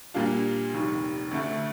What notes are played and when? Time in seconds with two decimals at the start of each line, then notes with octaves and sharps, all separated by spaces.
0.14 A#2 G3 A#3 D4 F4
0.73 F1 D#2 D#3 G3
1.31 D2 D3 A3